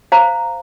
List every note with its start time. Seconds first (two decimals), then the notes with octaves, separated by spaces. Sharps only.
0.12 C5 F5 A#5